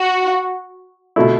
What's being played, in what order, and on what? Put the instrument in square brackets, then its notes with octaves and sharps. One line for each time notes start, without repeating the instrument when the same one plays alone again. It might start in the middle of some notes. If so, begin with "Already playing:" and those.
Already playing: [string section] F#4
[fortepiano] B2 A3 E4